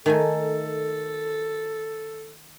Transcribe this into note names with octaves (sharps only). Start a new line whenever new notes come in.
D#3 A3 A4 G#5